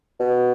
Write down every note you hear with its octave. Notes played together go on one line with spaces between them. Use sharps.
B2